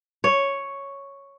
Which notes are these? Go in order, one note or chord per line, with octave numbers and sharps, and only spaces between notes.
C#5